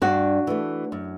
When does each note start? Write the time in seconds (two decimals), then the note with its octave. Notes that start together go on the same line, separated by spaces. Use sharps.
0.02 G2 D4 F#4
0.47 E3 A3
0.92 F#2